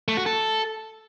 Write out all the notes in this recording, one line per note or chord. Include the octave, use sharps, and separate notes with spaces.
A3
F#4
A4